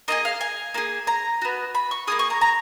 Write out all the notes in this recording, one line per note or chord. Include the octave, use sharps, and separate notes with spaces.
A#3 F4 G#4 D#5
F5
G#5
A#3 F4 G#4
A#5
B3 F#4
B5
C#6
A#3 F4 G#4 D#6
C#6
A#5
A#5